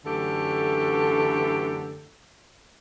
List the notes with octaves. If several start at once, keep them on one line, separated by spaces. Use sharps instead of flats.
F#2 D3 E3 A3 G4 A4